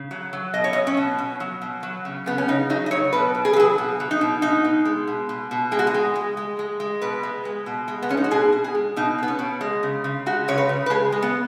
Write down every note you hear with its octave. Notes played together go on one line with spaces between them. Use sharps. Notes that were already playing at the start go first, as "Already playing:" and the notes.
Already playing: C#3
F#3
F#3
B2 D#5
C#5
D#5
F#3
C#4
B2
B2
F#3
B2
F#3
C#3
C#3 B3
C#4
C#3 D#4
F#3 D#4
D#5
F#3 C#5
B2 B4
B2
G#4
B4
F#3 G#4
B2
F#3
D#4
B2
B2 D#4
B2
G#3
B2
B2
B2
G#3 G#4
F#4
G#4
G#3
G#3
G#3
G#3
G#3
B2 B4
G#3
G#3
B2
G#3
B3
G#3 C#4
D#4
F#4
B2 G#4
B2
G#4
G#3
B2 D#4
B2 B3
C#4
B2
G#3
C#3
C#3
G#3 F#4
C#3 C#5
B4
C#3
B4
G#3 G#4
G#3
B3